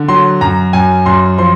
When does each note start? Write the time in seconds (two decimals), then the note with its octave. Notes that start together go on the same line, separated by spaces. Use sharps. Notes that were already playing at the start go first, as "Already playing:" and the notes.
Already playing: D3
0.08 F#3 C6
0.41 F#2 A#5
0.73 F#2 G#5
1.06 F#2 C6
1.38 F3 C6